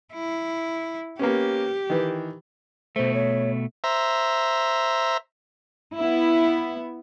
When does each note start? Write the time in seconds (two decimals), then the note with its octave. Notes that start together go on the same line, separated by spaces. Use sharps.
0.13 E4
1.19 A#3 B3 C#4 G4
1.90 D#3 E3
2.96 B2 A3 C5
3.14 C#5
3.84 C5 E5 A#5
5.95 B3 E4